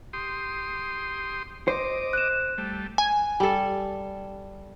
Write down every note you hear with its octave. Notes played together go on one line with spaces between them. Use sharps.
G4 C6 D#6
C5 D#5 D6
F#6 E7
G3 A3
G#5
G3 A4